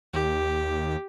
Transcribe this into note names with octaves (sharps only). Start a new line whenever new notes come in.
D#2 G4